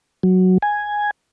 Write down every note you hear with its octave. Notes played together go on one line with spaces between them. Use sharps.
F#3
G#5